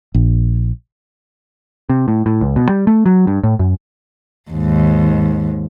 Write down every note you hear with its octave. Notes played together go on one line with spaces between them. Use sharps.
A#1
C3
A2
A2
C#2
B2
G3
A3
F#3
G2
A2
F#2
D#2 G#2